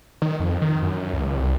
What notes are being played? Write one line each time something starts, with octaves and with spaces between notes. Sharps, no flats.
D#3
F2
D#3
F#2
C#2
C2